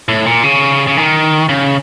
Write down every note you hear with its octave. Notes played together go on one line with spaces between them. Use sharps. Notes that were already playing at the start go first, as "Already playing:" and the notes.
A2
A#2
C#3
C#3
D#3
C#3